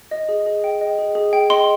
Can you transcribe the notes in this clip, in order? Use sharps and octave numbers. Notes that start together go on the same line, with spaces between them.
D#5
G#4
G#4
G5
D#5
G#4
G#4
G5
D#5 C6